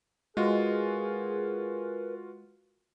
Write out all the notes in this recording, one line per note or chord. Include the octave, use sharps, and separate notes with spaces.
G#3 F4 F#4 G#4 A#4 B4